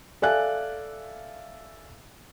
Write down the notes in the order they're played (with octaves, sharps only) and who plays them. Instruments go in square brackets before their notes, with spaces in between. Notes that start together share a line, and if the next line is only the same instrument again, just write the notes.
[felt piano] A4 D5 E5 F5 G#5 F#6